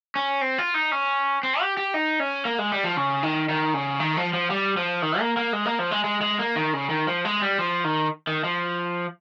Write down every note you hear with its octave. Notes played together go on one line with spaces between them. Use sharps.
C#4
C4
F4
D#4
C#4
C4
G4
G4
D#4
C#4
A#3
G#3
G3
F3
C#3
D#3
D#3
C#3
D#3
F3
F3
G3
F3
D#3
A#3
A#3
G#3
A#3
F3
G#3
G#3
G#3
A#3
D#3
C#3
D#3
F3
G#3
G3
F3
D#3
D#3
F3